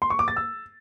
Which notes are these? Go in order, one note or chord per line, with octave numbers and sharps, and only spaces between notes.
C6
C#6
D6
A6
E6